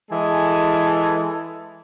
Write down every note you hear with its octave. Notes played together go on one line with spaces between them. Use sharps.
E3 G#3 A4 G#5